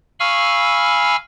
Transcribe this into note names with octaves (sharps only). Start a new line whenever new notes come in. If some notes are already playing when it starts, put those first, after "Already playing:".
F5 G#5 B5 C#6 E6 F6